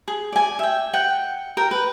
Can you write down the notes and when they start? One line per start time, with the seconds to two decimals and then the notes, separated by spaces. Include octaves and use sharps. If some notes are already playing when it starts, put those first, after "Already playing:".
0.08 G#4
0.32 D5 G#5
0.59 E5 G5
0.93 F#5 G5
1.57 A#4 G5
1.71 B4